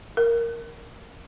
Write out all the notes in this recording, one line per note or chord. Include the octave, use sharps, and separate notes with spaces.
A#4